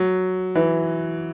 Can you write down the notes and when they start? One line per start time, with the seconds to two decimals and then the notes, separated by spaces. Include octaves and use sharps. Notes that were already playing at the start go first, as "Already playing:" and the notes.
Already playing: F#3
0.55 E3